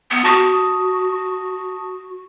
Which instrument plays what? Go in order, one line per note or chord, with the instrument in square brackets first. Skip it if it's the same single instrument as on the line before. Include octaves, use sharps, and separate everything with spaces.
[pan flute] B3
[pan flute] F#4 [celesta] A5 D#6